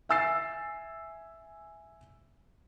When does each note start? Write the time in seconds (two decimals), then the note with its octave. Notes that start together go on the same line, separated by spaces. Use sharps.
0.09 E5 G#5 E6 A6 C7